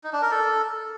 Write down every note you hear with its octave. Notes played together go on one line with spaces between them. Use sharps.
D#4
D4
A#4
A4